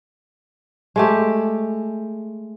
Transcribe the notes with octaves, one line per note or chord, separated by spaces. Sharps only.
G#3 A3 G4